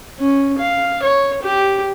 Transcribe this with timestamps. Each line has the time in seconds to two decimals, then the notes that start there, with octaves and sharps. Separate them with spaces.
0.19 C#4
0.59 F5
1.02 C#5
1.42 G4